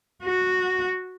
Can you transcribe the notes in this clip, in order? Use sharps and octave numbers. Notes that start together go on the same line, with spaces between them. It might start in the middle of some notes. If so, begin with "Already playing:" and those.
F#4